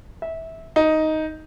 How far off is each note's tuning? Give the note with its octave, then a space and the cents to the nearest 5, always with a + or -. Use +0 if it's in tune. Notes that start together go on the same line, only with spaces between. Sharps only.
E5 -20
D#4 +5